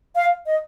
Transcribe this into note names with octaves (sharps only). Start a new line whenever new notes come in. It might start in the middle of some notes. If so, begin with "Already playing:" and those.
F5
D#5